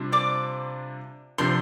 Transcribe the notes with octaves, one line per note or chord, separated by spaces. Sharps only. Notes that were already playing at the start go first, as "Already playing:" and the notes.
Already playing: C3 G3 D4 F4 C5
D5 D6
C3 F3 D4 C5 C6